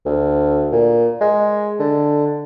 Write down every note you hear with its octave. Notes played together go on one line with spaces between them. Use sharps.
D2
A#2
G#3
D3